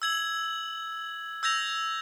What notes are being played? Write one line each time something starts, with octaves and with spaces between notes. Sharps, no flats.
E6 G#6 F#7
E6 G6 G#6 A#6 F7